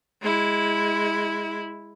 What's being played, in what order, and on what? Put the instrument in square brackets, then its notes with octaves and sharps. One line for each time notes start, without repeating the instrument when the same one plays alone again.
[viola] G#3 E4